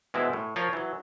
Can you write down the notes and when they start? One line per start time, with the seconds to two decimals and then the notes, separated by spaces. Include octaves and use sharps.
0.14 B2 E3 G#3 C4 E4
0.33 A2
0.56 F3 F4 A#4 C#5
0.73 E3 F#3